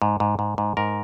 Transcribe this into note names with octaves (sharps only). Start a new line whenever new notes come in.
G#2
G#2
G#2
G#2
G#2 A#4